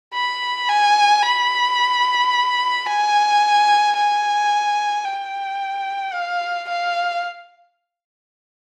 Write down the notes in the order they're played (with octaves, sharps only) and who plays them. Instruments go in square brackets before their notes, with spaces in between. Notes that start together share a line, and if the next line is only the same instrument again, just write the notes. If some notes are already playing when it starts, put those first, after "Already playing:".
[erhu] B5
G#5
B5
G#5
G#5
G5
F5
F5